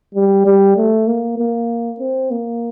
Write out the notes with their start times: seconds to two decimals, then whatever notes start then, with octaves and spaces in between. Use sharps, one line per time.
0.15 G3
0.46 G3
0.77 A3
1.08 A#3
1.38 A#3
2.00 C4
2.31 A#3